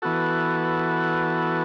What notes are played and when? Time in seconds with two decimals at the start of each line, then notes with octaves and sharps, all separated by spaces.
0.02 E3 B3 F#4 A4